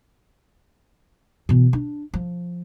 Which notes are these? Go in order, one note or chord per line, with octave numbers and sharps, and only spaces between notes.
B2 E3
D4
F3